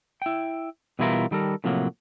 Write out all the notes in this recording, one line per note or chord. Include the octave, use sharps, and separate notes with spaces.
E4 G5
B2 E3 G3 E4 F4 A#4
D#3 G3 A4 A#4
A2 C3 F3 F#3 A#3